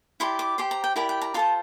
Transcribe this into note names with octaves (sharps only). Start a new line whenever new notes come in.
E4 G4 D5 C6
D6
G4 C5 C6
A#5
G5
E4 G4 A#4 D5 G5
G5
A#5
F4 A4 C5 A5